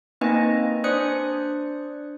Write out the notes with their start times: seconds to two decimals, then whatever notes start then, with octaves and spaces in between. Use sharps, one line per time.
0.21 A#3 C4 D#4 B4 D#5 G#5
0.84 D4 C5 D5 D#6 F#6 C#7